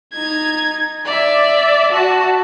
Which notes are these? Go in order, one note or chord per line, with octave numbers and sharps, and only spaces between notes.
D#4 G#6
D5 E5
F#4 A5